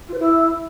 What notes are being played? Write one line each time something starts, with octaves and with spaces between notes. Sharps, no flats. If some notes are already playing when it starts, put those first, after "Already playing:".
F4
C5
E4